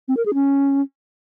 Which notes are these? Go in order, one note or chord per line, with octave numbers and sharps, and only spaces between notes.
C4
A#4
G#4
C#4